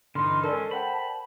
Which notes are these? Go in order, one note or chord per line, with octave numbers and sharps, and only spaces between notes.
G2 D3 E3 D#4 B5 C6 F6
G#3 C#4 A4 A#4 D5 A5
C5 F#5 G5 B5